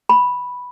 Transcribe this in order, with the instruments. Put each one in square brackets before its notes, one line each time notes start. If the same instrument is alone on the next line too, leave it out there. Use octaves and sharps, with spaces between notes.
[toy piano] B5